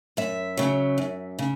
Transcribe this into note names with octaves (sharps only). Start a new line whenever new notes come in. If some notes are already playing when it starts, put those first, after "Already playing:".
F#2 E5
C#3 F#3
F#2
C#3